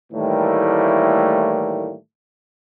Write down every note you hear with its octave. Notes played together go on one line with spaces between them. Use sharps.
A2 D#3 E3 G3 A3 A#3